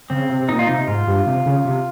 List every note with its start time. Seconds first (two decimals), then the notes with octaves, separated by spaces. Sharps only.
0.10 C#3 C4
0.29 C3
0.41 C3
0.49 A#2 D#4
0.59 F4
0.67 C3 D#4
0.87 G#2 F4
1.07 G2
1.27 C3
1.46 C#3
1.65 C3